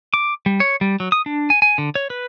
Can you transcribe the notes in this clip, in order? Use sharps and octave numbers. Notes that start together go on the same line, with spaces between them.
D6
G3
C#5
G3
F#3
D#6
D4
G#5
G#5
D3
C#5
B4